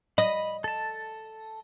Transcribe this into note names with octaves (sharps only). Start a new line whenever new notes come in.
D#5 B5
A4 A5